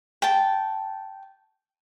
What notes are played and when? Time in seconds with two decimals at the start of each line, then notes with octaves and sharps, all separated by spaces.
0.22 G5 A5